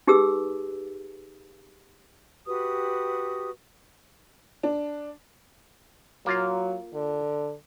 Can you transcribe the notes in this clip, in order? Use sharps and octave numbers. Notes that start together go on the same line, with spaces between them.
D#4 G4 G#4 B4 E6
F#4 G4 B4 D#6
D4
F#3 A#3 F4 F5
D3